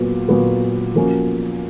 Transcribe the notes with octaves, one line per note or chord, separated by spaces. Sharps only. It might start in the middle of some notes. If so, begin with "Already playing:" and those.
Already playing: A#2 F#3 B3
A#2 F#3 B3
F3 A#3 C#4 F#4